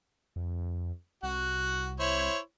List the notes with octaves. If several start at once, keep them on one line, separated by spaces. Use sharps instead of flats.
F2
C2 F#4 F#5
E4 C5 C#5